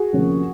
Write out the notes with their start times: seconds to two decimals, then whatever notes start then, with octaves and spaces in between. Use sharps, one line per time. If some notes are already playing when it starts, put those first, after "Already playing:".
Already playing: F#4 G#4
0.13 D2 C3 F3 A#3 C#4